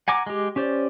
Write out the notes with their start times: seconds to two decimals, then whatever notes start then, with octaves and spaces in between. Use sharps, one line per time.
0.08 F#5 G#5 A#5 D6
0.26 G#3 G4
0.56 C#4 G4 C5 D5